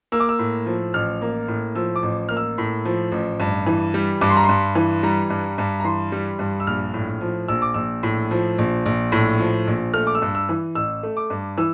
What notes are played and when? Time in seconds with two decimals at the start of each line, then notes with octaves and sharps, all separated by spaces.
0.12 A#3 E6
0.20 D6
0.29 E6
0.39 A2
0.66 F3
0.94 A1 F6
1.22 A#3
1.48 A2
1.75 F3 E6
1.96 D6
2.02 A1
2.29 A#3 F6
2.37 E6
2.58 A2
2.85 F3
3.12 A1
3.40 G2
3.67 E3
3.94 G3
4.21 G2 D6
4.29 C6
4.37 A#5
4.44 G2 C6
4.75 E3
5.03 G3 A#5
5.30 G2
5.58 G2
5.80 A#5
5.84 E3 C6
6.12 G3
6.39 G2
6.60 E6
6.67 A#1 F6
6.94 A2
7.21 F3
7.48 A#1 E6
7.62 D6
7.74 A#1 E6
8.03 A2
8.31 F3
8.58 A#1
8.86 A#1
9.12 A2
9.40 F3
9.67 A#1
9.94 A3 F6
10.07 D6
10.15 E6
10.22 G2
10.35 E6
10.49 E3
10.75 A1 E6
11.03 A3
11.17 D6
11.30 G2
11.58 E3 E6